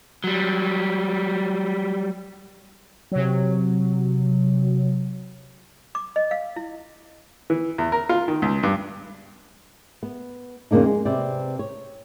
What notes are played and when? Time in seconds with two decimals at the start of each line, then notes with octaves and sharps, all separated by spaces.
0.24 F#3 G3
3.12 C3 F#3
5.95 D6
6.16 D#5
6.31 F5
6.56 E4
7.50 E3
7.78 E2
7.92 A#4
8.09 F4
8.28 D#3
8.42 C#2
8.63 G2
10.03 B3
10.71 F2 C#3 A#3 D4 D#4
10.86 G#3
11.05 C3 C4 B4 D5
11.59 C#5